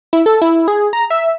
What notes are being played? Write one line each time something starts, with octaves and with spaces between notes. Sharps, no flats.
E4
A4
E4
G#4
A#5
E5